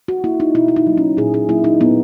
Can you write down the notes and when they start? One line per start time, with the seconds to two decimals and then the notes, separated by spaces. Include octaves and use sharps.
0.08 F#4
0.24 A#3 E4
0.40 D#4
0.55 B2 E4
0.68 E4
0.76 D#4
0.87 F#3 A#3
0.97 C#4
1.17 A#2 G#4
1.34 G#4
1.49 F#3 A#3 E4
1.64 D#4
1.80 A#2 B3